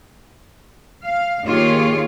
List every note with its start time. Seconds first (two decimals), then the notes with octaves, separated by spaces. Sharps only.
1.04 F5
1.46 D#3 A#3 F4 G4 G#4 C#5